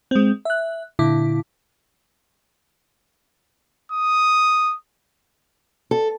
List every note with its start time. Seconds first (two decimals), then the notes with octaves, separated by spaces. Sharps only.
0.11 G#3 C4
0.45 E5 F#6
0.99 A#2 D3 E4 D6
3.92 D#6
5.91 A4